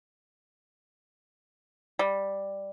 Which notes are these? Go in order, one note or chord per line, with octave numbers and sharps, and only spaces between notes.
G3